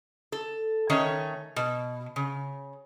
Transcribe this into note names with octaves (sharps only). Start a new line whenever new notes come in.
A4
D#3 A3 C#4 C#5
B2
C#3